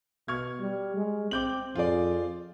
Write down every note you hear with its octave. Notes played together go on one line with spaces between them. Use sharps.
B2 C#6 F6 G#6
G3
G#3
C4 D6 G6 F#7
F2 F4 G#4 D5